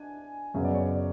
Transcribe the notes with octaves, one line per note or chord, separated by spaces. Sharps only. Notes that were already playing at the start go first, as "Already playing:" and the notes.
Already playing: D4 G#5
F#2 C#3 F#3 B3
D5
C#5
D5